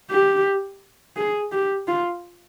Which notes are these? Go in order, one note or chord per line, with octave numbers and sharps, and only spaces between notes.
G4
G#4
G4
F4